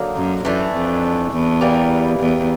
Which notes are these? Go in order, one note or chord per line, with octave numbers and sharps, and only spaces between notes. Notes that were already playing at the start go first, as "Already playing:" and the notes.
Already playing: D3 F#3 A#3 D#4
F#2
F#2 E3 A3 D4
F2
E2
E3 G3 A#3
E2